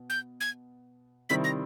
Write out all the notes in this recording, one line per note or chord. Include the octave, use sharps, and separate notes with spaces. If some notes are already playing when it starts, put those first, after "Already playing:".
Already playing: B2
G6
G#6
C3 D#3 G3 C4 E4 B6
A#6